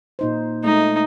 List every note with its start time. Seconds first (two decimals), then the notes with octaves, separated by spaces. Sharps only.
0.19 A#2 D#4 C5
0.64 G#3 A3 D#4